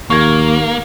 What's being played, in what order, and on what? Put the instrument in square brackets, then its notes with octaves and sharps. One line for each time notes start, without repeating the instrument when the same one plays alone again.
[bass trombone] D#2 [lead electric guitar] A#3 [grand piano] C#6 G#6